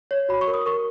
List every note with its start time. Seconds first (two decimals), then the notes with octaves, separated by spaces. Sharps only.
0.11 C#5
0.29 F#4 B5
0.41 C#6
0.48 A#4
0.54 D#6
0.66 A#4 C#6